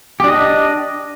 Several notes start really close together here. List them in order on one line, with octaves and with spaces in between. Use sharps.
G4 D4 D#5